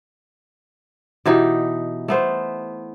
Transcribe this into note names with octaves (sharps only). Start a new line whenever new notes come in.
B2 E3 D#4 G4
A3 B3 C5